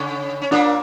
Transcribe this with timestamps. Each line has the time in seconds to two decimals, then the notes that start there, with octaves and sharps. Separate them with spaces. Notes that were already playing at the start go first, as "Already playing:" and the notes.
Already playing: C#3 C#4
0.42 C#4
0.51 A#2 A#3 D4